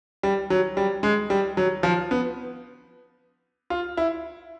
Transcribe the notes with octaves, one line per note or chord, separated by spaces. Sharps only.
G3
F#3
G3
G#3
G3
F#3
F3
B3
F4
E4